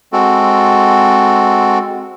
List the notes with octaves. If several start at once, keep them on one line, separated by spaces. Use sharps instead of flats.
G#3 C4 F#4 A4